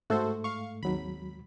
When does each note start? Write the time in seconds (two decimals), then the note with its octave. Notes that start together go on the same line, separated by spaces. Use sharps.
0.10 G#2 A3 F#4 A4 C5
0.44 F5 C#6
0.83 G#1 D#2 F#3 B5